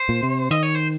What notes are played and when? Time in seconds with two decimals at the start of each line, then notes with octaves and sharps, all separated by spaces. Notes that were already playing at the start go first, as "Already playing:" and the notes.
Already playing: C5
0.09 A#2
0.23 C3
0.51 D#3 D#5
0.63 C#5
0.75 C5